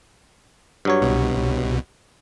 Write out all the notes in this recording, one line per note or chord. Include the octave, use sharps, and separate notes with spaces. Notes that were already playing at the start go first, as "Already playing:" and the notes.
G2 F#3 C#5
C2 B2